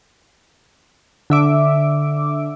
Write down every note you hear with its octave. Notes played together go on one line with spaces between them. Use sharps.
D3 E5 D6